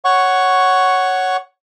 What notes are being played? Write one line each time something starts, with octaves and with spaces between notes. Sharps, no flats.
C#5 F#5 C#6